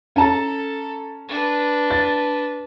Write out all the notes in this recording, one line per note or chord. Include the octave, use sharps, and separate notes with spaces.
C#4 A4 A5 A#5
D4 B4
A6